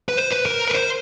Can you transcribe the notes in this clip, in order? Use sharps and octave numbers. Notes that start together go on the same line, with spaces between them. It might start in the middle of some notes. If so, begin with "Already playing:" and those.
B4
C5
B4
A#4
B4
C5